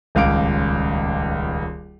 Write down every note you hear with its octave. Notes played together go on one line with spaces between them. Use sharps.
D#1 C#2 F5 D6 D7